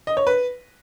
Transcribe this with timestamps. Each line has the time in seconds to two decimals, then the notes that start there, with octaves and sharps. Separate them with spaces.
0.07 D#5
0.17 C#5
0.27 B4